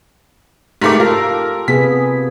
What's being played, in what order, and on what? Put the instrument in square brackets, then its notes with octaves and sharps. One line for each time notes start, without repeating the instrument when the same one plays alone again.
[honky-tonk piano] G#2 A3 D6 [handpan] G4 A#4
[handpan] F4 A4 F5 [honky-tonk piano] A#4
[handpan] C3 B3 G#4 [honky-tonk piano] B6